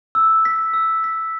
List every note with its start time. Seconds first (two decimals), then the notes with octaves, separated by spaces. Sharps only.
0.15 E6
0.45 B6
0.74 E6
1.04 B6